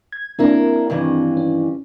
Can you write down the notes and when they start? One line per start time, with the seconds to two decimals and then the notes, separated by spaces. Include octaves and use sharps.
0.12 G#6
0.39 A#3 C4 D4 E4 A#4
0.90 G2 D#3 E3
1.37 C#4